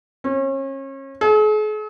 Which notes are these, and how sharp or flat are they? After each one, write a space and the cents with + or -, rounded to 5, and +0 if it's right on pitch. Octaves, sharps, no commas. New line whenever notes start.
C#4 -35
G#4 +45